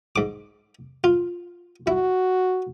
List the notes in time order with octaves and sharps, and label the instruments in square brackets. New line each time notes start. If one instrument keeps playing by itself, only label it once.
[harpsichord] G#2 D6
F4
[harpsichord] E4 [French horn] F#4